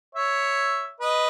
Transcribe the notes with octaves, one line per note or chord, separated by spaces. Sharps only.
C#5 E5
B4 D#5